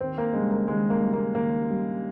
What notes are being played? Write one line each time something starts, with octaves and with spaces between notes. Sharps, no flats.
D#2 C4
A#3
C#3 G3 G#3
A#3
D#2 G#3
A#3
C#3 G3
A#3
D#2 A#3
C#3 G3